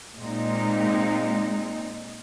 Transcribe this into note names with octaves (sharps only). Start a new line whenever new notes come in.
A#2 G#3 C4 D#4